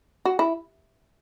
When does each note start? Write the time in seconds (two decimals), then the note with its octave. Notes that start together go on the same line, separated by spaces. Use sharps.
0.25 F#4
0.39 E4